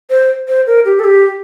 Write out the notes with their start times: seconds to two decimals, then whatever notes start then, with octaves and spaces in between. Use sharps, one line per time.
0.10 C5
0.48 C5
0.67 A#4
0.85 G4
1.00 A4
1.04 G4